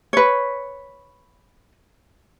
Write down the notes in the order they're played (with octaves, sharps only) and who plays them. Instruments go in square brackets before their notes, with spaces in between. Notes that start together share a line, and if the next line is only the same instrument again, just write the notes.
[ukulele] B4 C#5